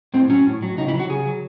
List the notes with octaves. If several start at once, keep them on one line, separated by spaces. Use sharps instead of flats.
A2 C4
F#3 C#4
A2
F#3
C#3 D#4
E4
F#3
F#4
C#3 G#4
F#3